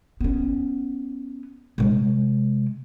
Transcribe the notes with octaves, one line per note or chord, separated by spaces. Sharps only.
B3 C#4
C3 G#3